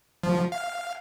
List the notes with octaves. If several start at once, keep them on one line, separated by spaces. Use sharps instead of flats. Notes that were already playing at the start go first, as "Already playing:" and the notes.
F3
F5